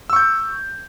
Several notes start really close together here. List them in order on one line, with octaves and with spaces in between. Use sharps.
E6 C#6 G6